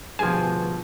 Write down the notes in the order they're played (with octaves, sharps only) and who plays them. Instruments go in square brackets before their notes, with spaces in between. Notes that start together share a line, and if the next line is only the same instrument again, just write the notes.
[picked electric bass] D2 G2 [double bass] B2 [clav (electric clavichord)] F3 G#4 [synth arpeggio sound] G#5